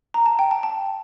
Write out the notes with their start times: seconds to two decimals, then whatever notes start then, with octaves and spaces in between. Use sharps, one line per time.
0.14 A#5
0.26 A5
0.39 G5
0.51 A5
0.63 A5